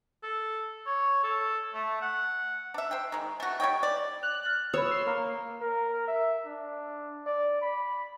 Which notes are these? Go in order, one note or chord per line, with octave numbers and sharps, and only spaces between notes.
A4
C#5
A4
A3
F#5
D4 E5
C5 G5
D#3 G#3
A3 F#4
G3 C#5 D#5 G5
D5
F#6 F7
F6 A6
C#5 B5 D#6 E6
C6
A#3 A#5 F6
A#4
E5
D4
D5
B5